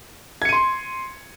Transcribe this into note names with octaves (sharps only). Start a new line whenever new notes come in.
C6 G#6 C#7 D#7